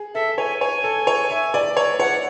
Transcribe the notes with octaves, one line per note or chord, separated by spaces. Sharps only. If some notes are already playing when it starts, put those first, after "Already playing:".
Already playing: G#4
A4 E5
C#5 G#5
C#5 G#5
A4
C#5
E5
D5
C#5
C#5 F#5